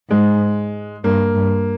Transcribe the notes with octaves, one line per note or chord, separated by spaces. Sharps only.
G#2 G#3
G2 A#3
G2